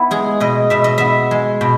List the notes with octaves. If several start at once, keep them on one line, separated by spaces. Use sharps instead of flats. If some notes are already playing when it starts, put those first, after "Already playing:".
Already playing: B3 E4
G#3 G#4
B2 D#5
B2 E5
D#5
B3 E5
G#3
B2